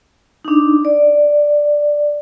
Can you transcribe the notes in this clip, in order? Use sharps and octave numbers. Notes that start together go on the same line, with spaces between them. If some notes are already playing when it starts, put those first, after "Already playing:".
D4 D#4
D5